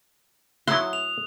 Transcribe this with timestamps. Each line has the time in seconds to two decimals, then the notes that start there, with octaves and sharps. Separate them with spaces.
0.67 F#3 E4 C6 D#6 F#6
0.93 F7